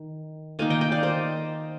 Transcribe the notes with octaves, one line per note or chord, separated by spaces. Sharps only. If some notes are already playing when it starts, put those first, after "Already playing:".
Already playing: D#3
D#3 A#3 D#4 F5 G#5
D#5 G5
D#5 G5
D5 F5
C5 D#5